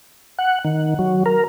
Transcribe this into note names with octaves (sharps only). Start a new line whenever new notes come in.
F#5
D#3
F#3
A#4